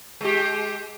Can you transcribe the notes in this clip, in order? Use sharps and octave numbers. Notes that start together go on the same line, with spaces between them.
G#3 G4